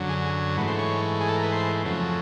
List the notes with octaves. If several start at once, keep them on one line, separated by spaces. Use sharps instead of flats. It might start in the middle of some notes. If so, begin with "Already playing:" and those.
Already playing: F#2 D3 F#3
G#4
G#4
G#2 E3 A3 B4
C5
C#5
G#4
A4
A#4
B4
C5
F2 C#3 F#3 A3